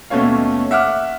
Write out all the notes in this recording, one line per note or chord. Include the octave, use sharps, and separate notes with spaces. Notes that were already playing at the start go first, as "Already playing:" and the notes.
D#2 B2 A3 C#4 C#5 F5
E5 F#5 D6 F6